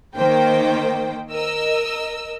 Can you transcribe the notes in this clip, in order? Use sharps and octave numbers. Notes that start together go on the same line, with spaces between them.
D#3 A#3 C5 G5
A#4 D#5 E6